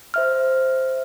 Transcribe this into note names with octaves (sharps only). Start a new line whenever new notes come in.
C5 E5 F6